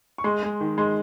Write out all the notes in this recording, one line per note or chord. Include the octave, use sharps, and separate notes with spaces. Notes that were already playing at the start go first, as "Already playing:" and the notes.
C#6
G#3 C6
G#3
D#3
G#3 C6